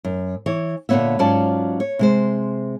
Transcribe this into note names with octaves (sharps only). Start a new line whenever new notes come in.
F#2
E3 C#5
A#2 D3 F3 B3 C#5 E5
G#2 F#3 C#4 F4 D5 A5
C#5
C3 G#3 C5